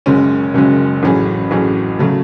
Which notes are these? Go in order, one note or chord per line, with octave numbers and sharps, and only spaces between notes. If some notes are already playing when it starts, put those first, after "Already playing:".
F#1 F#2 C#3 G#3 C#4
F#1 F#2 C#3 G#3 C#4
A1 A2 F#3 C#4 G#4
A1 A2 F#3 C#4 G#4
C#3 F#3 A3